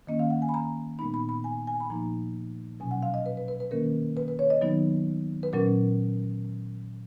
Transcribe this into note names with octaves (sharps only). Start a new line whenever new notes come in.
D#3 A#3 C#4 D#5
F5
F#5
G#5
B5
A#5
A#2 G#3 B3 D#4 B5
B5
B5
G#5
G#5
B5
A#2 F3 A#3 D#4 A#5
B2 F#3 C#4 G#5
F#5
F5
D#5
B4
B4
B4
B4
D#3 A#3 C#4 A#4
B4
B4
C#5
D#5
D#3 F#3 B3 D#4
B4
A#2 F#3 C#4 A#4